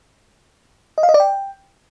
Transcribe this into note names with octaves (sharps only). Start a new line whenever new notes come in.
D#5
F5
D#5
D5
G5